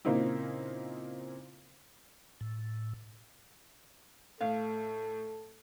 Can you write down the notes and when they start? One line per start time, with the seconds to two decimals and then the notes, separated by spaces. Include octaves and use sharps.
0.05 A#2 C#3 A#3 C4 D#4 E4
2.41 A2
4.41 A2 A4 F5